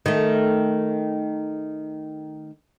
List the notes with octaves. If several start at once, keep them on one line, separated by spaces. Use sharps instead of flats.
D#3 A3